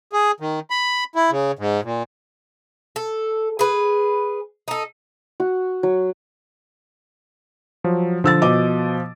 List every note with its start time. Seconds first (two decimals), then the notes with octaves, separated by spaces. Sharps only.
0.13 G#4
0.40 D#3
0.70 B5
1.16 E4
1.31 C#3
1.59 G#2
1.84 A#2
2.96 A4
3.59 G#4 B4
4.68 D#4 A4
5.40 F#4
5.83 F#3
7.84 F3 F#3
8.24 D3 F3 E6 A6
8.42 B2 D#5 D6